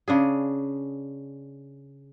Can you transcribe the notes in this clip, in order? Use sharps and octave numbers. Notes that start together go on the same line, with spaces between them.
C#3 D4 G#4